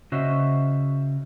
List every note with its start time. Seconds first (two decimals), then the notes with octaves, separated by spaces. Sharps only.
0.12 C#3 F#4 C5 D#5 E5